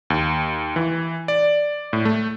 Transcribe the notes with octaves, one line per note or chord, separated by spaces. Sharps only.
D#2
E3
D5
A2
A3